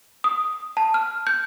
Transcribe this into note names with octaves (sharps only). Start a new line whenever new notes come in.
D#6
A5
F6
G6